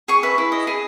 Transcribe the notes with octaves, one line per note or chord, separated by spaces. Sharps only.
G#4 C#6
B4 E5
E4
D#5
G#4